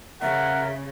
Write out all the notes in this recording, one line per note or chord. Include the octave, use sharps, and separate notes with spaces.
C#3 A#4 E5 F#5